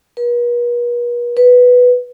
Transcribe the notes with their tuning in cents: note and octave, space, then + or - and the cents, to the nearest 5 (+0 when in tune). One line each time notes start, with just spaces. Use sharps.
B4 -45
B4 +0